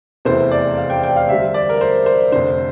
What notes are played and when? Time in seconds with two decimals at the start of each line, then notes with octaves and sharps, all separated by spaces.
0.25 F1 E2 E3 A3 C4 C5
0.51 D5
0.78 F5
0.90 G5
1.03 G5
1.16 F5
1.29 D2 C3 G3 C4 E5
1.54 D5
1.69 A#4
1.81 C5
2.06 C5
2.32 F1 F2 D3 C5